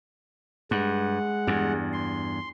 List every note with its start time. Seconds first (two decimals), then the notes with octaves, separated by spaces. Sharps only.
0.71 G2 G#3 F#5
1.47 E2 G2
1.93 C6